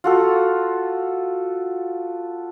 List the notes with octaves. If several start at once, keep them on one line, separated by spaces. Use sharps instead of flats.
F4 F#4 A4